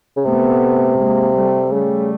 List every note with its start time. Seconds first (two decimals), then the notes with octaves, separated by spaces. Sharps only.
0.16 C#3
0.25 C3 A3 B3
0.98 G#3 A#3
1.36 G3 A3
1.72 C#3 G3 A3